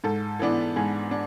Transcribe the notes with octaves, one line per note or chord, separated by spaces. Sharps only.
G#2 A4
E3 B3 D4
G#2 G#4
D4